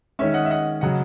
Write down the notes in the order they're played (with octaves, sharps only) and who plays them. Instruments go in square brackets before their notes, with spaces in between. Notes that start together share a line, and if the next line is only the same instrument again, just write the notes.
[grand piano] D#3 G#3 C#4 [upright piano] C#5 E5
[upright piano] D#5 F#5
E5
D#5 F#5
[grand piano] C#3 F#3 [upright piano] D#5 F#5